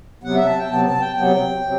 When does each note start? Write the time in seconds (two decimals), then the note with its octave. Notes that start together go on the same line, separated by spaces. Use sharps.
0.23 C3 F#3 B3 F#5
0.35 E5
0.46 A5
0.58 G5
0.69 C3 F#3 B3 A5
0.85 A5
1.00 G5
1.16 C3 F#3 B3 G5
1.63 C3 F#3